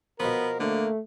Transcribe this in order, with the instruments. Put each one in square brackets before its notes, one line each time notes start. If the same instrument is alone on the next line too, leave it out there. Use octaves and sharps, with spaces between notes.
[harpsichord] B2 F3 [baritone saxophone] B3 [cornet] A#4
[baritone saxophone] D3 [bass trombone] A3 [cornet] A#3